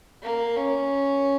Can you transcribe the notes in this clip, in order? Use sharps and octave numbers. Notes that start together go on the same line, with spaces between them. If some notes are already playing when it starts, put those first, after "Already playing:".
A#3
C#4